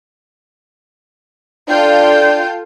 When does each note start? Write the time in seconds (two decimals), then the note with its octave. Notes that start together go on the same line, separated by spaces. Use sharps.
1.69 D4 F4 A4 G5